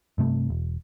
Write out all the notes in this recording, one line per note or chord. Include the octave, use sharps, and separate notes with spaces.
G2 C3 A3
E1